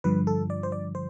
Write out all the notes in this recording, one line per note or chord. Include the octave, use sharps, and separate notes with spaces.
G2 D3 F3 B4
A4
D5
C5
D5
C5